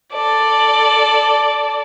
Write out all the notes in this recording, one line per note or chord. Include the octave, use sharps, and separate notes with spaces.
A4 D5